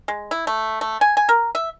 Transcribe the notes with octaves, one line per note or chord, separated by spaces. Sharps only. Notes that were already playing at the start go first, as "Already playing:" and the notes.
G#3
E4
A3
A3
G#5
G#5
A#4
E5